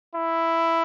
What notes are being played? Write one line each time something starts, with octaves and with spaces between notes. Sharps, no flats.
E4